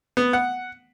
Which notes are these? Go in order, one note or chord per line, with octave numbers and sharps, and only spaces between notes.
B3
F#5